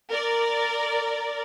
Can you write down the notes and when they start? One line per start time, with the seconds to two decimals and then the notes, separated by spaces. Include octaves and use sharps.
0.12 A#4 D5